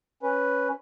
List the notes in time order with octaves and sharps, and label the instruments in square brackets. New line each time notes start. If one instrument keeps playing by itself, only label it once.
[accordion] C#4 B4